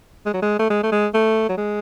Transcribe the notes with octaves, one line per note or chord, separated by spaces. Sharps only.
G#3
F#3
G#3
A3
G#3
A3
G#3
A3
F#3
G#3